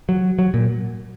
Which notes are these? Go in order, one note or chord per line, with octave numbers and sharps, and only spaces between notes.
F#3
F#3
A#2